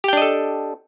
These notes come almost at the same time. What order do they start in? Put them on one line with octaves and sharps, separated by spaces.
G4 G5 D4 D#5 A4